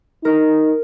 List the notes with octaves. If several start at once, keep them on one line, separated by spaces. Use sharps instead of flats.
D#4 A#4